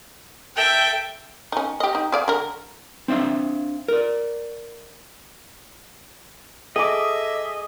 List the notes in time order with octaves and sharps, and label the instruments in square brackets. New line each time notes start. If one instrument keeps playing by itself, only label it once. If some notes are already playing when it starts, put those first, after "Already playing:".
[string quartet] A4 E5 [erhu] G5
[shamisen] C#4 D#4
G4 D#5
D#4
G#4 D5 F5
D3 A#4
[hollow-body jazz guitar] C4 D4 E5 F5
A#4 D5
[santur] G#4 D6 [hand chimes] A4 [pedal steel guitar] D#5 [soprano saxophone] E5